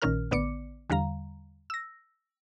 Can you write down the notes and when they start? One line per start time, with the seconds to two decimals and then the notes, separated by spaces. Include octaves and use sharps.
0.02 A#1 A#2 D#3 C#4 A#4 F6
0.31 A1 D3 B3 D5 D6 C#7
0.90 E2 D3 G3 F5 A#5
1.70 E6 A#6